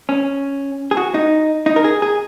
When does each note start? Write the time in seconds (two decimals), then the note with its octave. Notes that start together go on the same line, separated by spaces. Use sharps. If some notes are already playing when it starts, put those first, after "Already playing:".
0.09 C#4
0.91 G#4
0.97 F#4
1.14 D#4
1.66 D#4
1.76 A#4
1.84 G#4
2.02 G#4